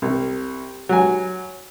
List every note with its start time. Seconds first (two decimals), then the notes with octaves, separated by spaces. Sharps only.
0.02 C2
0.89 F#3 G#5